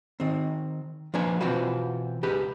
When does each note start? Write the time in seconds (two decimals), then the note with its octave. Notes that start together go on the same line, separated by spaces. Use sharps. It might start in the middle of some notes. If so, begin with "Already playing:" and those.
0.20 D#3 C4
1.14 F3 A#3 D4 B4 G#5
1.41 B2 E3 C4 F4 F#4 B4
2.23 C#2 G4 G#4 B4